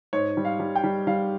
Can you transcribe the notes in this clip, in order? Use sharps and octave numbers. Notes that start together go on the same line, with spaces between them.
G#2 C#5
G3
F5
G3
G5
G3
G3 F5